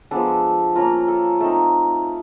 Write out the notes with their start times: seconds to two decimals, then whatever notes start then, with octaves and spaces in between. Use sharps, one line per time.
0.11 F3 G#3 B3 D4 A4
0.76 A#3 C#4 F4 A#4
1.08 A4
1.40 A3 C4 D#4 A4